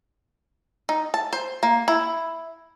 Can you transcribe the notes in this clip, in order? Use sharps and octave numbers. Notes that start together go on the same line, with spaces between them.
D#4
A5
C5
A#3
E4